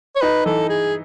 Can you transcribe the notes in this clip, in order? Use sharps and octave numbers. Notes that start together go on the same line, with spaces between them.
C#5
D#4 B4
E3 A4
G#4